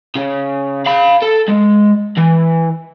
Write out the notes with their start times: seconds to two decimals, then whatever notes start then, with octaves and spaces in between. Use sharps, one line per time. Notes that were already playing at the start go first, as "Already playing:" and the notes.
0.15 C#3
0.86 F5 B5
1.22 A4
1.49 G#3
2.17 E3